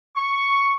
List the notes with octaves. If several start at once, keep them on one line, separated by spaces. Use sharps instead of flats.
C#6